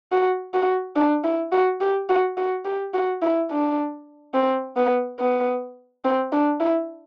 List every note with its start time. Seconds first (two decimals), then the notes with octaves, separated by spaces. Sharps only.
0.12 F#4
0.54 F#4
0.96 D4
1.24 E4
1.52 F#4
1.81 G4
2.09 F#4
2.37 F#4
2.65 G4
2.94 F#4
3.22 E4
3.51 D4
4.34 C4
4.77 B3
5.20 B3
6.05 C4
6.32 D4
6.60 E4